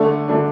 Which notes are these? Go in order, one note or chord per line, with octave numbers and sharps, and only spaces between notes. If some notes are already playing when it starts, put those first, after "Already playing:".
Already playing: D3 A3 D4
D3 A3 D4